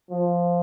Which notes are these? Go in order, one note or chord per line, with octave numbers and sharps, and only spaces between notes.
F3